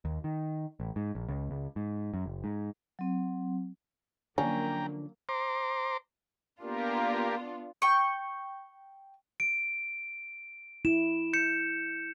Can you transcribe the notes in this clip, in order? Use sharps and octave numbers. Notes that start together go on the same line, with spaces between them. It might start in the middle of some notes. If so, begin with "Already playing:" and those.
D#2
D#3
A1
G#2
A#1
C#2
C#2
G#2
F#2
F#1
G#2
F#3 C4
D3 F3 F#3 A#3 C#4 D4 G5 A#5
C5 A#5 C6 D6
A#3 B3 D4 F4 G4 A#4
G5 C#6
D7
E4 E7
G6 C#7 E7